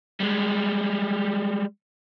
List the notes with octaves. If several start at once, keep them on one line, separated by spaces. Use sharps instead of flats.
G3 G#3